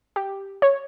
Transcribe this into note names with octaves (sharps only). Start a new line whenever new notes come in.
G4
C#5